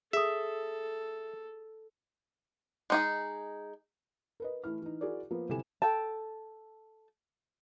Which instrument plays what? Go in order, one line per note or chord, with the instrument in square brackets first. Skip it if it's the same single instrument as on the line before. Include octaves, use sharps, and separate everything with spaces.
[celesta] G#4 D#6 [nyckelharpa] A4 [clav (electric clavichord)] E5
[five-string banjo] G#3 D#4 G#4
[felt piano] A#4 B4 D#5
E3 A3 E4 F6
E3 D#4
E4 F#4 G#4 A#4 D5
F3 A#3 B3
G1 C3 E4 A4 G#5 E7
[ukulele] A4 G5 A5